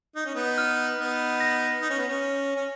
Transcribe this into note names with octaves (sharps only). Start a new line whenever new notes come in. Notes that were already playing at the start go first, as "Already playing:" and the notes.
D#4
C#4
B3 D#4
F6
B3 D#4
A#6
D#4
C#4
B3
C#4
C#4